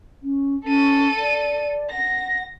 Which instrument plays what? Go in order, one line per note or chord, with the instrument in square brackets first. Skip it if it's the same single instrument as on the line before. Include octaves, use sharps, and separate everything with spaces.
[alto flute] C#4
[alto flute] C#4 [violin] A4 D#7
[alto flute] D5
[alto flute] F#5 [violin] A#6